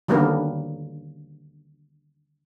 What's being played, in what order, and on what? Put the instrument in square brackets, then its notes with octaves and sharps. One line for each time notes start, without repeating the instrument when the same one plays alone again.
[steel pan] D3 D#3 F#3 G3 A#3 B3